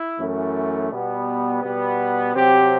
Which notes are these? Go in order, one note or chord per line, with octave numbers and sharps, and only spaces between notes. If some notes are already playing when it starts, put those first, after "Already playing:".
Already playing: E4
F#2 E3 A3
B2 G3 B3
B2 G3 B3
C3 F#3 C4 G4